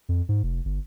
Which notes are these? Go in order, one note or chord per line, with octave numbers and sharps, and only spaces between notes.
F2
G#2
F1
G1